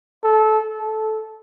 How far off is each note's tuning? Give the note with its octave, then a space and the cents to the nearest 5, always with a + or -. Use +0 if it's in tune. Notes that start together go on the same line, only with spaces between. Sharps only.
A4 -20
A4 -10